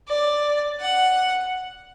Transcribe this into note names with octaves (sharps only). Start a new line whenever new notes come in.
D5
F#5